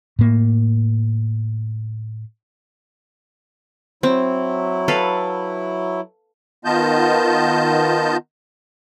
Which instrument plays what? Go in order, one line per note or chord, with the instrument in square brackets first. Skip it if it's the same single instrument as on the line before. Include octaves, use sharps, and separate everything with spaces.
[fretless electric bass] A2 A#3
[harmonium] F#3 E4 [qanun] C4
[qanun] A4 B4 F5
[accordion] D#3 B3 F4 D#5 A5 G6